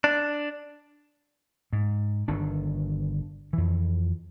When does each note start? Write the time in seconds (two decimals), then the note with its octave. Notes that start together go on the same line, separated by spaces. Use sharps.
0.04 D4
1.73 G#2
2.28 G1 D#3 D4
3.53 F2 E3